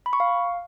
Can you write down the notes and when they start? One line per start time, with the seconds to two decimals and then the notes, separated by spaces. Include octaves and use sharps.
0.06 B5
0.13 C#6
0.20 F5